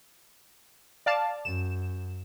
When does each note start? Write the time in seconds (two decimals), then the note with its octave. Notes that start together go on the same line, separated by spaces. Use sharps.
1.06 D5 F5 A5
1.45 F#2 E7